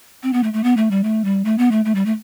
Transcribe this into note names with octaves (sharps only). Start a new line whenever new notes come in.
C4
B3
A3
A3
B3
A3
G3
A3
G3
A3
B3
A3
A3
G3
A3